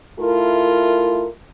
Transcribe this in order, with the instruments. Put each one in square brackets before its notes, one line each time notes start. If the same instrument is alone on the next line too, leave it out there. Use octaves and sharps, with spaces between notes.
[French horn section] A3 E4 F4 A#4